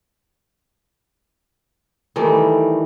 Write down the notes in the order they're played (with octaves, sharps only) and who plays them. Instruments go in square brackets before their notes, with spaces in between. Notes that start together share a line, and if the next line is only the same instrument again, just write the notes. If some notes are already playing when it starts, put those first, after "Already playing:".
[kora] D#3 E3 G3 A3